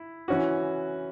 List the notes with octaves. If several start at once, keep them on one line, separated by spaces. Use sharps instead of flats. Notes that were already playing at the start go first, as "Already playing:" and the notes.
Already playing: E4
E3 C#4 F#4